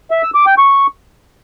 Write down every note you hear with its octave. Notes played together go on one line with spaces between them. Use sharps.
E5
E6
D6
G5
C#6